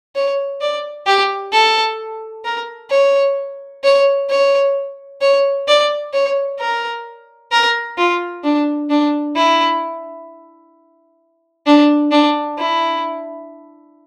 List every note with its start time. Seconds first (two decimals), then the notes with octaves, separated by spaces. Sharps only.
0.16 C#5
0.61 D5
1.06 G4
1.52 A4
2.45 A#4
2.91 C#5
3.84 C#5
4.29 C#5
5.22 C#5
5.68 D5
6.13 C#5
6.59 A#4
7.52 A#4
7.98 F4
8.44 D4
8.90 D4
9.36 E4
11.67 D4
12.12 D4
12.58 E4